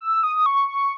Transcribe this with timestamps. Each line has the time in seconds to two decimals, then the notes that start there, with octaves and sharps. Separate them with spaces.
0.01 E6
0.23 D#6
0.35 D#6
0.46 C#6
0.68 C#6